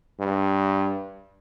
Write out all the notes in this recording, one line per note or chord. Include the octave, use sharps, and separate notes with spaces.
G2